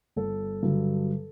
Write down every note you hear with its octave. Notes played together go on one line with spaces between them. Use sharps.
G1 A4
G2 D3 F#3